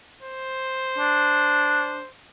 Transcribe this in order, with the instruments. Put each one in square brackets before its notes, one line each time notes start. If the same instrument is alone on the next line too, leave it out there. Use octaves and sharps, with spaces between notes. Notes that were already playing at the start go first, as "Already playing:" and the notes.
[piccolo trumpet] C5
[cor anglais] D4